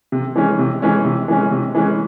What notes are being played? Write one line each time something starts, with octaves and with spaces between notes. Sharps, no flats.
C3
E3 G#3 C#4
C3
E3 G#3 C#4
C3
E3 G#3 C#4
C3
E3 G#3 C#4